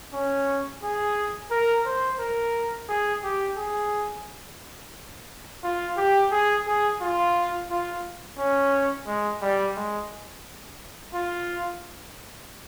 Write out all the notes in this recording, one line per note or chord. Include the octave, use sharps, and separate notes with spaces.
C#4
G#4
A#4
C5
A#4
G#4
G4
G#4
F4
G4
G#4
G#4
F4
F4
C#4
G#3
G3
G#3
F4